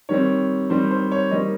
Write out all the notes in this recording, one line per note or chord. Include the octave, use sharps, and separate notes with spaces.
D#3 G3 C4 C#5
D#3 G3 C4 C5
C5
C#5
D#3 G3 A#3 D#5